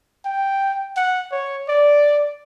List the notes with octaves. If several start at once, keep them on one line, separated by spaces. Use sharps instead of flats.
G5
F#5
C#5
D5